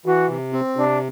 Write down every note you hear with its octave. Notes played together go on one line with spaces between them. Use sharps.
E3 F#4
C3
C4
C3 D4